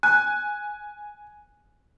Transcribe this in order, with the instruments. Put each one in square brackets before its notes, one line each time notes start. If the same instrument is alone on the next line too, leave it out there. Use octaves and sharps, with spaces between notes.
[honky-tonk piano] G#5 [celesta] F#6